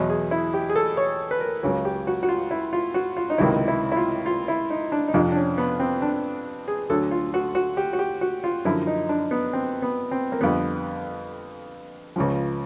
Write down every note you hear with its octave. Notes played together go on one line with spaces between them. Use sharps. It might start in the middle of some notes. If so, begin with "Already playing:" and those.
Already playing: E2 B2 F#3
G#4
E4
G4
G#4
A4
C#5
B4
A#4
C#2 C#3 F#3
G4
F#4
F#4
F4
E4
F4
F#4
F4
D#4
C#2 C3 D#3 F#3 E4
E4
E4
F4
F4
E4
D#4
D4
D#4
F2 C3 F3 D4
D4
C#4
B3
C4
D4
G#4
D2 D3 F#3 A4
F4
F#4
F#4
G4
F#4
G4
F#4
F4
F#2 D3 F3 E4
D#4
D4
B3
C4
B3
C4
A#3
F2 D3 G3 B3
C#2 C#3 F3